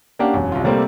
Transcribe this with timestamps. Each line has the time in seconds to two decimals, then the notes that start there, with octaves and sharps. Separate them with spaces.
0.19 A#3 C#4 D4 G4 F5 F#5
0.34 E1 F#2
0.52 C2 F4
0.64 C3 G3 A3 A#3 C4